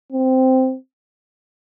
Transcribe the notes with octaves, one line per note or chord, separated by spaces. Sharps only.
C4